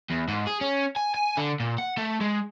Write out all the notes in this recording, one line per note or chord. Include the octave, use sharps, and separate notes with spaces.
E2
G#2
G#4
C#4
G#5
G#5
D3
A#2
F#5
A3
G#3